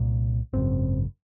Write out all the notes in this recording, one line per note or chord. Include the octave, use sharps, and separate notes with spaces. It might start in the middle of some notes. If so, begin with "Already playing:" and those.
Already playing: C2 A#2
G#1 F#2 C#3 C4